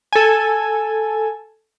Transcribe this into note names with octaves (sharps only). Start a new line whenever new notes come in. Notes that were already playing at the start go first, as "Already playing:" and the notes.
A4 G#5